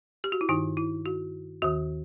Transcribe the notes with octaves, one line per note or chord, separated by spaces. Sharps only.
G4
F#4
E4
G2 D#3 D#4
E4
F#4
D#2 D#3 F#4